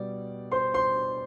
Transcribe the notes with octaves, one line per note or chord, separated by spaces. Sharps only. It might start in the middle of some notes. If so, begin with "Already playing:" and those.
Already playing: B2 G3 D5
C5 C6
C5 C6